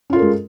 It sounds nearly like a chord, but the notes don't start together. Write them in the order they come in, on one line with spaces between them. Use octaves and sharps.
C#4 F4 A4 A#4 G#3